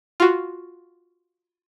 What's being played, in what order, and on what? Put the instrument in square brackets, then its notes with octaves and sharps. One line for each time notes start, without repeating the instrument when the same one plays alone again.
[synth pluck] F4 F#4